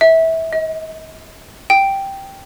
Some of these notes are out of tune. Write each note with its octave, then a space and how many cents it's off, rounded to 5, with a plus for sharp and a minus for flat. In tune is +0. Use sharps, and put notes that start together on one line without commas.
E5 -20
D#5 +35
G5 +0